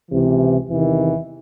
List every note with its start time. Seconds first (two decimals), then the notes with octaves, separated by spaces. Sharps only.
0.11 C#2 C3 E3
0.69 E2 C3 D#3 E3